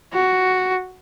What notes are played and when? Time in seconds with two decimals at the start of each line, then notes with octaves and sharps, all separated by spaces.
0.13 F#4